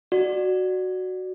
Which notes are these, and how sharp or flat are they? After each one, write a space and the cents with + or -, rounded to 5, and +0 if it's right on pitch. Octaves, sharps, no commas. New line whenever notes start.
F#4 +0 D5 +20